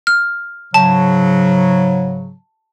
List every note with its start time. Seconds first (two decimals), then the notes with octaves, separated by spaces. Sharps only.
0.07 F6
0.74 G#2 C#3 F#3 A5